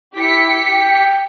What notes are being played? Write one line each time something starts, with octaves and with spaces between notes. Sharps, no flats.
E4 G4 B6 C#7
G5